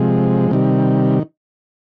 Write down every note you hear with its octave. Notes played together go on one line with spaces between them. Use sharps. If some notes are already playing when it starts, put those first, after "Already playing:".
Already playing: C3 F3 G#3
C3 D#3 G3